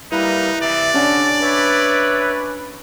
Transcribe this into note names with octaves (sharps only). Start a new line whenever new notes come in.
G3 A#3 D#4 E4 B4
C3 E3 D5
D3 C#4 D4
B4 C#5 E5